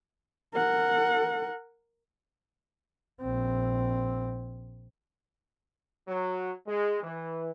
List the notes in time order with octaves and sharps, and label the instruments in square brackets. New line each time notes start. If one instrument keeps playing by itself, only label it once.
[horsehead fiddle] A#4 F#5
[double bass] A#1 C4
[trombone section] F#3
G#3
E3